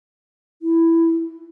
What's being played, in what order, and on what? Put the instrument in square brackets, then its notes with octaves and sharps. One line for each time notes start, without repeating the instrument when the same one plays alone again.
[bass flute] E4